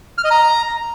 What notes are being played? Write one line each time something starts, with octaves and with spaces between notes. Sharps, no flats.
F6
D#5
A#5